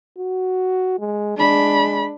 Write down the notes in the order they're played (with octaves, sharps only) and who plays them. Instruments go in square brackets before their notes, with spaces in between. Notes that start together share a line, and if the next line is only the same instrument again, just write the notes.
[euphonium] F#4
G#3
[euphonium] G#3 [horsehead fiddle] D4 B5